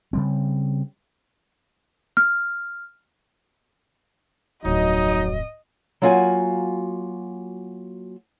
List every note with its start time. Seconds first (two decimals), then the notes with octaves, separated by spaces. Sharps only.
0.13 C#3 G3 C4
2.17 F6
4.65 D1 F2 F#3 D#4 D#5
6.02 F#3 A#3 F4 F#4 F5 G#5